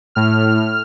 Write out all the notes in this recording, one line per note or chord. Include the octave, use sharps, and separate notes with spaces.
A2 F6